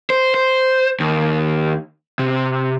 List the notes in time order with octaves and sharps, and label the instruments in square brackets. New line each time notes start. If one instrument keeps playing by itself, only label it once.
[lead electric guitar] C5
C5
D#2
C3